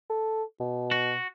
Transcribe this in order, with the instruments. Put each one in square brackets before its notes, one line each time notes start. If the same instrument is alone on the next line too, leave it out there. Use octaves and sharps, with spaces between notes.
[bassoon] A4
B2
[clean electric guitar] F#4